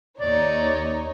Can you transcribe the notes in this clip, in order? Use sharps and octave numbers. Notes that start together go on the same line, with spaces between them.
D#2 D#4 C#5 D5